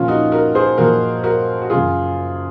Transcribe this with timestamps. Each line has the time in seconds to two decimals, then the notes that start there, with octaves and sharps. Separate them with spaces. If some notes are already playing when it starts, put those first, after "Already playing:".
Already playing: A#2 F3 C#4 F4
0.08 D#4 F#4
0.32 F#4 A#4
0.55 G#4 C5
0.78 A#2 F3 F#4 A#4
1.24 F#4 A#4
1.62 F#4
1.70 F#2 C#3 F#3 F4 G#4